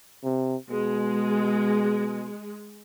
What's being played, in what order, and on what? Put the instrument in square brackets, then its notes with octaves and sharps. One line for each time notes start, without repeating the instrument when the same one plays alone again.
[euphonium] C3
[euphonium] B2 [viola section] G#3